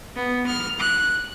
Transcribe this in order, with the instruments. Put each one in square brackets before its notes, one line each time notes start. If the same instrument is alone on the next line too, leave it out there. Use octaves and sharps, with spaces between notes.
[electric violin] B3
F6
F#6